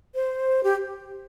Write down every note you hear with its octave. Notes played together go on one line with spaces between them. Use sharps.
C5
G4